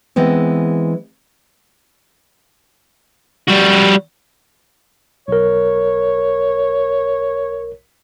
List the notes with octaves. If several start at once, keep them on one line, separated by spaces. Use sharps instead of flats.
E3 G#3 B3 C4
G3 F#4
B1 A#4 C#5